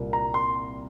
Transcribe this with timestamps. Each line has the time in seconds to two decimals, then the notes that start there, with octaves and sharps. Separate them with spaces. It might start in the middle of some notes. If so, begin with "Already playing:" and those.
Already playing: C2 A#2 G3 A#3
0.13 A#5
0.34 C6